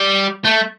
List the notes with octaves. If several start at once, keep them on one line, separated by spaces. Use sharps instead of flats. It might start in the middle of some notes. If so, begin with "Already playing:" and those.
Already playing: G3
A3